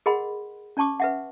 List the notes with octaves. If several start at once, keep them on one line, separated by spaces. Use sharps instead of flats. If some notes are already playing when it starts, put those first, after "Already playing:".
G#4 A#4 D#5 F#5 B5 C6
C#4 D5 A5 C#6 D6
B4 E5 F#5